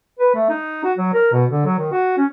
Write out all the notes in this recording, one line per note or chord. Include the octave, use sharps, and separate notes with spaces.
B4
A3
D#4
F#4
F#3
A#4
B2
D3
F#3
D#3
F#4
C#4